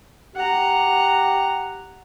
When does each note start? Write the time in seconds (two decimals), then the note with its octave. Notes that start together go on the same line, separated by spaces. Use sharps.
0.36 G4 F#5 A#5